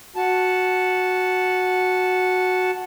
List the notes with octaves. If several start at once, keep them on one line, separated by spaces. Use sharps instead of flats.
F#4 A5